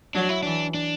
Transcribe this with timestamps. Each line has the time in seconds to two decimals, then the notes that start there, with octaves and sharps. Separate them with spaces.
0.15 F#3 D4
0.29 E4
0.43 E3 D4
0.74 D4